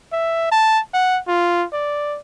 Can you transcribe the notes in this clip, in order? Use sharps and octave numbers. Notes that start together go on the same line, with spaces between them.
E5
A5
F#5
F4
D5